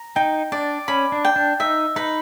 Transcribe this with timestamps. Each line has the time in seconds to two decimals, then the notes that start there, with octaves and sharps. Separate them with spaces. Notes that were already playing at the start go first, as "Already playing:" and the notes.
Already playing: A#5
0.16 D#4 G5
0.52 D4 D5
0.88 C#4 B5
1.12 D4
1.25 G5
1.36 D4
1.60 D#4 E5
1.96 D#4 B4